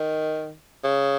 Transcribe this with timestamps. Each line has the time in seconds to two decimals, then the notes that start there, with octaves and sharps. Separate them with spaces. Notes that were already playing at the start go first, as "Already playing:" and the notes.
Already playing: D#3
0.84 C#3